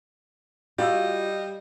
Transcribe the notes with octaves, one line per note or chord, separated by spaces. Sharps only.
G3 F4 F#4 D#5 F5 E6